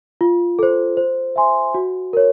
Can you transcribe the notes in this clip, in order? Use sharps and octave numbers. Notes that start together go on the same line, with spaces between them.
F4
A4 C5
C5
E5 G#5 C6
F#4
A#4 C#5